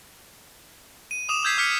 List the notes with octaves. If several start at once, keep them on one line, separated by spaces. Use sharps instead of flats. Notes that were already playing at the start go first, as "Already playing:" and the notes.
D#7
D6 D#6 E7 F7
D#6 E6 G6 G#6 B6 C7
D6 F6 B6 C#7